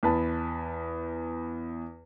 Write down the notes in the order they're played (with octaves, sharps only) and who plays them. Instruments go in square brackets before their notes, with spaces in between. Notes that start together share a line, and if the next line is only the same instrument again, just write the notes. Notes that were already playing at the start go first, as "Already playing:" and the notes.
[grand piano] E2 B4 A5